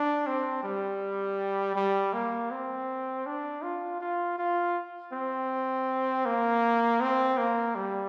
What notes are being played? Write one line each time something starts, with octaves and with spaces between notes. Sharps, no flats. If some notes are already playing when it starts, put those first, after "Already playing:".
Already playing: D4
C4
G3
G3
A#3
C4
D4
F4
F4
F4
C4
A#3
C4
A#3
G3